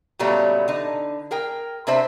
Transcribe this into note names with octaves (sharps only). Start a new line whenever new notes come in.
A#2 C#3 F#3 G3 A3 B3
D3 D#4
G#4 A#4 G5
C3 D4 B4 C5 E5